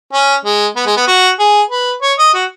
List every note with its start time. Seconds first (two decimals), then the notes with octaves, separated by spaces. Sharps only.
0.13 C#4
0.45 G#3
0.76 B3
0.86 G#3
0.97 B3
1.08 F#4
1.40 G#4
1.70 B4
2.02 C#5
2.19 D#5
2.34 F#4